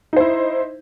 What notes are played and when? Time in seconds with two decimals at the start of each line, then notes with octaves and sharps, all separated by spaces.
0.13 D#4
0.17 C5
0.20 E4